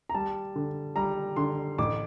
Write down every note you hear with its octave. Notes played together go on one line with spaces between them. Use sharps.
A#5
G3 A5
D3
G3 A#5
D3 C6
A1 D6